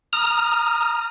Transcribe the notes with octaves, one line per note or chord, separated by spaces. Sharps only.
A#5 D#6 F6